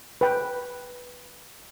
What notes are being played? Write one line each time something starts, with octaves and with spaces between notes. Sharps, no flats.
B4 G5